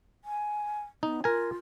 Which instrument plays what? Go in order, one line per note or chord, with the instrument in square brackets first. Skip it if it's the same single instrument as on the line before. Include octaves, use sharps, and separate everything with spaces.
[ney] G#5
[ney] B3 [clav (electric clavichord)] D#4
[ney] F4 [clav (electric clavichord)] A#4 G#5